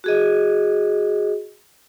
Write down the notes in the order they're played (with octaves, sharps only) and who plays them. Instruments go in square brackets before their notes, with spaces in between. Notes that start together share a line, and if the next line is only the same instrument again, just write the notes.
[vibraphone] F#4 G#4 D#5